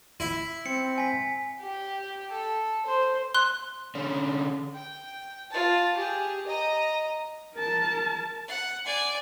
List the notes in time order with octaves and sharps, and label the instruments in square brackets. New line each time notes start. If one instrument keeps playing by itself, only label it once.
[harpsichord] E4 E5
[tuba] C4 [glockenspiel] C#7
[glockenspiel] G#5 B6
[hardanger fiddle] G4
A4
C5
[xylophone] C6 F#6
[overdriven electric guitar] D3 C#4
[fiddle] G5
F4 A5
G4 G#4
D#5 A#5
[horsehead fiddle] A#4 A5
[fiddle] F#5
D5 G#5